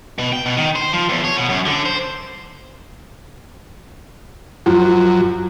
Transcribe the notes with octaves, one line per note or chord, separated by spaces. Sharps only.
B2
G5
B2
D#3
C5
F3
E2
C#5
B2
F#2
D3
C5
F#2 F3